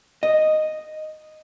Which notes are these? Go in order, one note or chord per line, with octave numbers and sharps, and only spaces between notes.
D#5